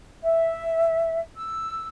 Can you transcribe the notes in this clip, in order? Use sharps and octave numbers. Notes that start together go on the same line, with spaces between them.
E5
E6